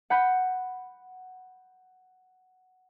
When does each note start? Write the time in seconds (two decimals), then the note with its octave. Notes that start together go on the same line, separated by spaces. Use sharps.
0.10 F#5 B5 G6